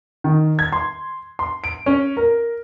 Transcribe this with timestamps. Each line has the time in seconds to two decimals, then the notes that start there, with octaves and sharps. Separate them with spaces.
0.24 D#3
0.59 G#6
0.72 C6
1.39 C6
1.64 D7
1.86 C#4
2.17 A#4